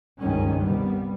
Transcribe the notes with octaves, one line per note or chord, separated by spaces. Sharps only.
F#1 C#2 G2 D#3 G3 C#4
C2 G3 B3